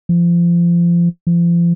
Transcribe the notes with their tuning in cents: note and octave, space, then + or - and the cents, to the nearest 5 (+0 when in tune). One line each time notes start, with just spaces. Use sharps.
F3 -25
F3 -35